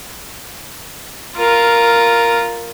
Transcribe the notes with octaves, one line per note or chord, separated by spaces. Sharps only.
F4 A#4